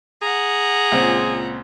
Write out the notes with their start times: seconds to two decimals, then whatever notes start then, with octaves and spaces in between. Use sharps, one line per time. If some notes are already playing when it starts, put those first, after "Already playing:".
0.22 G#4 F#5 A#5
0.92 C#2 A#2 C4